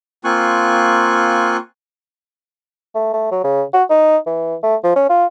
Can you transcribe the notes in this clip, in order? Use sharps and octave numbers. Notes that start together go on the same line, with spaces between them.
A#3 C4 F4 G#5 C#6 F#6
A3
A3
F#3
C#3
F#4
D#4
E3
A3
F3
C#4
F4